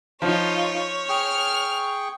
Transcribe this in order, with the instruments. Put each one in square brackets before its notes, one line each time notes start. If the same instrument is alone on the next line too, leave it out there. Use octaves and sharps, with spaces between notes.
[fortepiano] F3 [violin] D#4 F4 [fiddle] C#5
[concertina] G#4 G5 C#6 [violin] F6